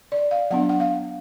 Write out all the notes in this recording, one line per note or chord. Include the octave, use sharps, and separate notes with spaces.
D5
F5
F#3 B3 D4 F#5
F#5
F5